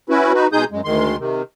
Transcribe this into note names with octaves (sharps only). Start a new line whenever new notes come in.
C#4 E4 F#4 B4
D#4 F#4 B4
B2 G#3 D#4 G#4 D#6 G6
F#2 G#3
D2 D#3 G#3 C6
C3 D#3